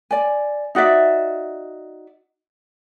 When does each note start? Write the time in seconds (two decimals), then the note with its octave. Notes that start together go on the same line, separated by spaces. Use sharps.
0.11 D5 G#5
0.75 D#4 F#4 D5 E5